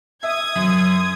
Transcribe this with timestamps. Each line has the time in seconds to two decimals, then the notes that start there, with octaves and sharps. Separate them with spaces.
0.23 E5 D#6 G#6
0.55 F#2